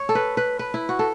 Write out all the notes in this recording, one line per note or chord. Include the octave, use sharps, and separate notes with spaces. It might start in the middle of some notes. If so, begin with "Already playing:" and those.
Already playing: C#5
A4
B4
B4
B4
E4
F#4
A4